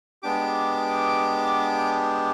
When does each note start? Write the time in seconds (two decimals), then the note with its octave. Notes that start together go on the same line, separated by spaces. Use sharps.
0.23 G#3 B3 D4 G4 D6